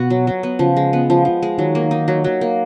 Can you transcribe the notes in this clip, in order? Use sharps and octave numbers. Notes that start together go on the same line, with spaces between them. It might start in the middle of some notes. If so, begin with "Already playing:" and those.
Already playing: B2 B3 F#4
F#3
F#3
B3
C#3 F3
G#3
B3
F3
F3
G#3
D#3 F#3
A#3
D#4
F#3
F#3
A#3